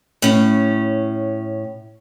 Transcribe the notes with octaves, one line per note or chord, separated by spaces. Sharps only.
A2 C#4